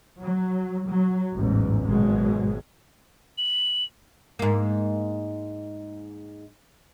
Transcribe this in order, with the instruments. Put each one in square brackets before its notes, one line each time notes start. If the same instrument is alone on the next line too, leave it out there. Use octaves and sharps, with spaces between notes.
[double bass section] F#3
F#3
A1 E2 G#2
G#1 B2 F#3 G#3
[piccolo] F#7
[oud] G#2 A#3